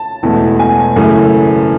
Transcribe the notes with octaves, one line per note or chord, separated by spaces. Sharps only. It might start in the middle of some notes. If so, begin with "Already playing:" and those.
Already playing: A5
E1 E2 B2 A3
G#5
F#2 C#3 E3 A3